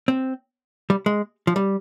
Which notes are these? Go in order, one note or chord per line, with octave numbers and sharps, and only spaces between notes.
C4
G3
G#3
F3
G3